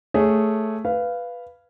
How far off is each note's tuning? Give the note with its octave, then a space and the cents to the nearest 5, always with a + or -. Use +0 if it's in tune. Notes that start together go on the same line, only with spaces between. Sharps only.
A3 +0 G#4 +0 C#5 +0
B4 +0 F5 -10